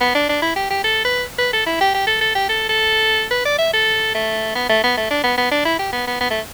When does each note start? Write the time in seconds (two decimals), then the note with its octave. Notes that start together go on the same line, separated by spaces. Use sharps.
0.01 B3
0.15 D4
0.29 D4
0.42 E4
0.56 G4
0.70 G4
0.84 A4
1.05 B4
1.39 B4
1.53 A4
1.66 E4
1.81 G4
1.94 G4
2.07 A4
2.21 A4
2.35 G4
2.49 A4
2.69 A4
3.31 B4
3.45 D5
3.58 E5
3.73 A4
4.15 A3
4.55 B3
4.69 A3
4.84 B3
4.97 A3
5.11 D4
5.24 B3
5.37 B3
5.51 D4
5.65 E4
5.79 G4
5.93 B3
6.07 B3
6.21 B3
6.31 A3